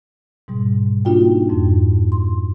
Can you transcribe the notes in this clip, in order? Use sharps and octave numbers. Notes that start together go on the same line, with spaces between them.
G#2 B2 G3
A#3 D4 D#4 F4 F#4 G5
F2 G#2
C6